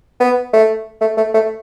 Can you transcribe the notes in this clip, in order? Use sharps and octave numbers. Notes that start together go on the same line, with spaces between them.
B3
A3
A3
A3
A3